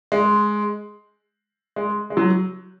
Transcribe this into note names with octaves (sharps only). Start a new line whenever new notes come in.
G#3
G#3
G#3
F#3